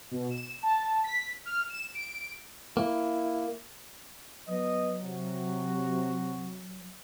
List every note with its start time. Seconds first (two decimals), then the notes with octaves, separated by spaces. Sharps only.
0.11 B2
0.30 E7
0.63 A5
1.04 B6
1.45 F6
1.69 E7
1.94 D7
2.77 A#3 E4
4.47 F#3 B3 B4 D#5
5.01 C3 F#4